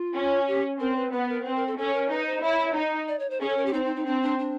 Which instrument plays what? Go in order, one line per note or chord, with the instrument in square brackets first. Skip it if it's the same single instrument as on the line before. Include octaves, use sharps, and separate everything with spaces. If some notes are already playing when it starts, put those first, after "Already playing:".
Already playing: [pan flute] F4
[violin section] C#4
[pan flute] G4
[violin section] C4 [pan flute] A#4
[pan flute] B4
[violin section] B3 [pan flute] B4
[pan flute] A#4
[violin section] C4 [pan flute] B4
[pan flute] A#4
A4
[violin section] C#4 [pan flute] A4
[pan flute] A#4
[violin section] D#4 [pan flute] B4
[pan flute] C5
[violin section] E4 [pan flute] C#5
[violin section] D#4
[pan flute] D5
C#5
C5
[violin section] C#4 [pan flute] G#4
[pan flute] A4
A#4
G4
[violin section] C4 [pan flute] D#4
[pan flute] D#4
D#4
[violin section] C4 [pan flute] D4
[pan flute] D4
D4